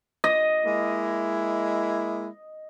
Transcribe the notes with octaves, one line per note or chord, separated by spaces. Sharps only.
D#5
G#3 A#3 E4